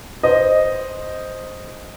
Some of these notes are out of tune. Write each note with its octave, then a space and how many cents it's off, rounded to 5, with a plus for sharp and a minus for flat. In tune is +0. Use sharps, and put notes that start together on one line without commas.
C5 +0 D#5 +0